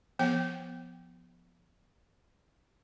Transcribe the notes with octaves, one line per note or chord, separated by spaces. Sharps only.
F3 B3 G5